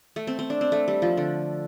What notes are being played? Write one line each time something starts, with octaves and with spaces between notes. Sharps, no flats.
A3
C4
C4
D4
C4
A3
G3
F3
D3